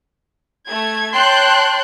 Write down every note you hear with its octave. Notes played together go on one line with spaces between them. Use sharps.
A3 G#6
C#5 G5 A5 C6 F#6 G6